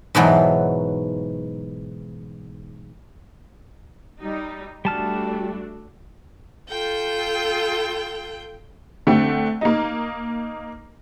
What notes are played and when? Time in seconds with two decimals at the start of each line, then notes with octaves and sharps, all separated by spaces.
0.15 G#2 B2 E3 F#3
4.20 G3 D#4
4.85 G3 A3 D4 F#4 A5 F6
6.69 F4 A4 G5 G6
9.07 D3 A3 C4 G5
9.61 A#3 D#4